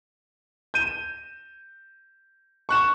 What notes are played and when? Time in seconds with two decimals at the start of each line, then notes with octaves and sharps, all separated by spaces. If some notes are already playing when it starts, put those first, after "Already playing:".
0.74 G6 D#7 E7
2.69 C#6 F#6 E7